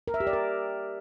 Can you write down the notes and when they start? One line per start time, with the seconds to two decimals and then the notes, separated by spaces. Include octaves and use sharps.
0.08 A#4
0.14 E5
0.20 G4
0.27 D5
0.33 A#4